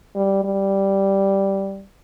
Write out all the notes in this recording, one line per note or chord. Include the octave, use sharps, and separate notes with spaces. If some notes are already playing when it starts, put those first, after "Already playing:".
G3
G3